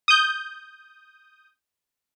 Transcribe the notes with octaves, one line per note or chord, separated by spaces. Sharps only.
D#6 G6